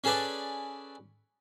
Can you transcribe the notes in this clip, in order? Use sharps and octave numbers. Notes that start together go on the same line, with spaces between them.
C#4 G#4 A4 B4 D5